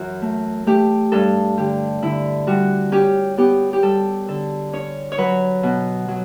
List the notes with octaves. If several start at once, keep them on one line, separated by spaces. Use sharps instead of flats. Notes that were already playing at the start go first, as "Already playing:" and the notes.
Already playing: F#2 E3 F#4
A3
A3 G4
G2 A4
D3 G4
D3 E4
G3 F#4
C#4 G4
B3 G4
G4
G3 A4
D3 A4
C#4 C#5
C#5
F#3 B4
B2
F#3